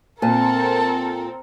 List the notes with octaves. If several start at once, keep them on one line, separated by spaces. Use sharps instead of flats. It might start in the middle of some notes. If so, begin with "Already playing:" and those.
A#2 C4 A4 A#4 A5